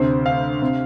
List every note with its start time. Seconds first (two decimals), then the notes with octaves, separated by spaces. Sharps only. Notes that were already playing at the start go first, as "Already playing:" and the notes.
Already playing: D2 C3 C5
0.26 F5
0.62 C3